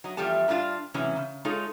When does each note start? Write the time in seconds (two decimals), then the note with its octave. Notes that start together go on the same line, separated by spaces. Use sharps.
0.04 F#3 D#5
0.17 E2 F3 G3 A3 G4 A5
0.48 G2 G3 D4 F4 F5
0.94 A2 C3 E3 F#3 G#3 C#4
1.16 C#3
1.45 G#3 D#4 F4 A4 C#5